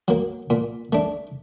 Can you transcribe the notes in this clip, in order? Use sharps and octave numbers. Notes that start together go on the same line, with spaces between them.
F#3 A#3
A#2
A3 D4